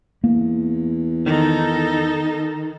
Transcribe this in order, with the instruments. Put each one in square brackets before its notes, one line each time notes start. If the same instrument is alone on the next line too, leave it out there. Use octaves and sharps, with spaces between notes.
[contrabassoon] E2 [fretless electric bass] A#3
[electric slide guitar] D#3 [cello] D#4 A4